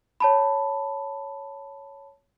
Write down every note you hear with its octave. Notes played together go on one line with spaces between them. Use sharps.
C#5 A5 B5